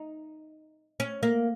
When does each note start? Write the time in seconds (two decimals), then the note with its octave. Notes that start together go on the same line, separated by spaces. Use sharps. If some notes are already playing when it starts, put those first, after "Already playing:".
Already playing: D#4
1.00 C#4
1.23 A#3